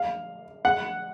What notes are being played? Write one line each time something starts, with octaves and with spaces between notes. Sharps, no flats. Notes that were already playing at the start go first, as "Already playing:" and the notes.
Already playing: F5
F#5